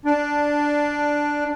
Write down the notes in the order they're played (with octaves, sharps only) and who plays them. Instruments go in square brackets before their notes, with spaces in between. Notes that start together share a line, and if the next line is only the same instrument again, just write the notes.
[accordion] D4